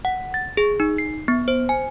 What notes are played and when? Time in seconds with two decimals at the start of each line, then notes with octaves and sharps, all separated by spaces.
0.05 F#5
0.34 A6
0.57 G#4
0.80 D#4
0.98 C7
1.28 B3
1.48 C5
1.69 G#5